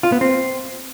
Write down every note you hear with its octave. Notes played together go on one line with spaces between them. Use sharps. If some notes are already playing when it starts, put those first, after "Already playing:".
F4
B3
C4